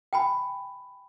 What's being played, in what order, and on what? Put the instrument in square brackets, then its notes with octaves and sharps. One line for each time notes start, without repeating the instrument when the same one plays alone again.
[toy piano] G5 G#5 B5